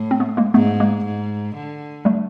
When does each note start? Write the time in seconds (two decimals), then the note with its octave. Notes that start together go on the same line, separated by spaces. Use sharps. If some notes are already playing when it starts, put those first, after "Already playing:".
Already playing: A2
0.11 C4
0.20 A3 B3
0.37 G#3 A#3
0.54 G#2 A3 B3
0.80 G#3 A#3
1.05 G#2
1.55 D3
2.05 G3 A3